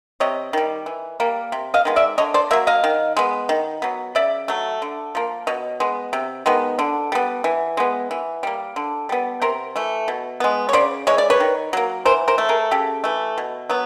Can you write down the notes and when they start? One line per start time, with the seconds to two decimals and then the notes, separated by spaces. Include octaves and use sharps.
0.20 C3 C#5 D#5
0.53 D#3 G3
0.86 E3
1.20 G3 A#3
1.52 C3
1.74 D#5 F5
1.85 D#3 G#3 B3
1.96 D5 E5
2.18 D3 C#5 D#5
2.34 C5 D5
2.51 F#3 A#3 E5
2.67 D#5 F5
2.84 D#3
3.17 G#3 B3
3.49 D#3
3.82 F#3 B3
4.15 C#3 D5 E5
4.48 F#3 A3
4.82 D3
5.15 F3 A#3
5.47 B2 C#5 D#5
5.80 G#3 B3
6.13 C3
6.46 D#3 G#3 B3
6.79 D3
7.12 G3 B3
7.44 E3
7.77 G#3 B3
8.11 E3
8.43 G3 A#3
8.76 D3
9.09 G3 B3
9.42 C3 A#4 C5
9.76 E3 A3
10.08 B2
10.40 G#3 B3
10.69 C#5
10.73 C#3 C5 D5
11.07 E3 G#3 C#5
11.18 D5
11.30 B4 C#5
11.40 D#3
11.73 F#3 A#3
12.05 E3 A#4 C5
12.28 A#4 C5
12.38 A3
12.49 G#4 A#4
12.71 C#3 G4 A4
13.04 E3 A3
13.38 B2
13.69 F#3 B3